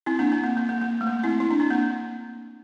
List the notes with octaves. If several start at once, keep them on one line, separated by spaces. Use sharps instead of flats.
C4 E4
A#3 D4
C4
A#3
A#3
A#3
A#3
A3
A#3
C4 E4
E4
D4
C4
A#3 D4